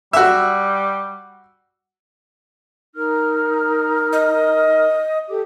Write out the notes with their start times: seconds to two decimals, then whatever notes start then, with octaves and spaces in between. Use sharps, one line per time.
0.13 G3 F#4 E5
2.95 D#4 A#4 F6
4.13 D#5
5.29 G4 A4 D6